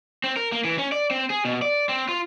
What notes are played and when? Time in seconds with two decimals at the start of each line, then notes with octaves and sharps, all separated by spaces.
0.24 C4
0.36 A#4
0.52 A#3
0.64 E3
0.78 C#4
0.92 D5
1.11 C4
1.30 G#4
1.45 B2
1.62 D5
1.89 C4
2.09 F4